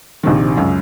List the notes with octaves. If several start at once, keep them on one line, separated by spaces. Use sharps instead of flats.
A#1 C3 D#3
C#2 F#2